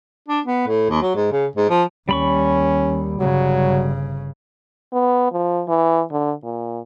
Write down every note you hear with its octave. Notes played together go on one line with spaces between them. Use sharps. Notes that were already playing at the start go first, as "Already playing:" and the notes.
D4
B3
A2
D#2
F#3
G#2
C#3
G#2
F3
D#2 G3 C#4 B5 C#6
G1 C#3 F#3
B3
F3
E3
D3
A#2